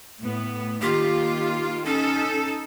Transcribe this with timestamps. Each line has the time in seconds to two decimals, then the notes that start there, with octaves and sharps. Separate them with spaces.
0.21 A2 B3
0.82 D#3 A#3 F4 G4
1.86 C#4 D#4 A4